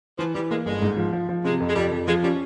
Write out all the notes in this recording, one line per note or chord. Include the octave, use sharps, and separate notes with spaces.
E3 F3
E3 G3
G#3 A#3
G1 G#3
G#2
F3
F3
F3
C3 G#3
F2
G#3
F2 G3
F2
F3 G#3
G3 C#4